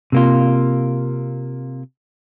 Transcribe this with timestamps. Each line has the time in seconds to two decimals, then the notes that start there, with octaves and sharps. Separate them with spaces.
0.12 C3 A#3 F4